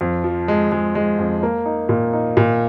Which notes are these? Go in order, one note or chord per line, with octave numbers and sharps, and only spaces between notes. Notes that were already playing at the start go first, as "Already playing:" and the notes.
F2
F3
G#3
G#3
G#3
F2
A#3
D#4
A#2
D#4
A#2